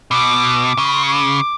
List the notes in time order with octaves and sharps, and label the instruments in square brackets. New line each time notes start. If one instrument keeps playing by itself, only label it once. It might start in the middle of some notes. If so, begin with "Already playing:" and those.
[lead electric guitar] B2 [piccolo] D6
[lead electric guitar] C#3
[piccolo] B5
C6
C#6
D6